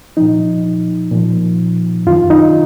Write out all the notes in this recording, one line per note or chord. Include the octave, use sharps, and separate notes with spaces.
A#2 F3 D#4
A#2 F3
F#2 D#3 F4
D#4